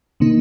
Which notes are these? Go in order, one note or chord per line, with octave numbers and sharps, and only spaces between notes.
C3 D#3 A#3 D#4